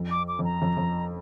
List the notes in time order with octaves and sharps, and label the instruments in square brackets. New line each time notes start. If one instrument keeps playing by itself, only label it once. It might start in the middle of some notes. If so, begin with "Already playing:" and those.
Already playing: [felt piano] F2
[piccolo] D6
D6
[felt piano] F2
[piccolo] A#5
[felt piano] F2
F2